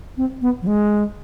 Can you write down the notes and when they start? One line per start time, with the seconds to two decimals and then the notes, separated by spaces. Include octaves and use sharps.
0.17 C4
0.42 B3
0.62 F3
0.67 G#3